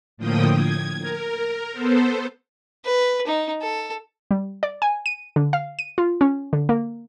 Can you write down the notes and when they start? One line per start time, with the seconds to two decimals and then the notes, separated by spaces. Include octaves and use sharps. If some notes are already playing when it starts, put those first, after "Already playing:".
0.17 A2 D3 F3 A#3 G5 D#6
0.55 G#6
1.01 A#4
1.72 B3 A4 C5
2.85 B4
3.27 D#4
3.62 A4
4.31 G3
4.63 D5
4.82 G#5
5.06 D#7
5.36 D3
5.53 F5
5.79 D#7
5.98 F4
6.21 C#4
6.53 D3
6.69 A#3